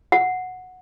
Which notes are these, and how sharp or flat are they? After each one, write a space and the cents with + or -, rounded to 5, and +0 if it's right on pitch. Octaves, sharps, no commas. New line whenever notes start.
F#5 -5